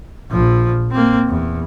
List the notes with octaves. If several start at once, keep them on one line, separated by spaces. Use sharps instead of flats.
A#1 F3
A#3 C4
E2